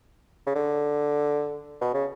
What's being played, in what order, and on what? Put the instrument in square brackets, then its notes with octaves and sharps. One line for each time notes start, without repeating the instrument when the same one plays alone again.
[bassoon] C#3
D3
B2
C#3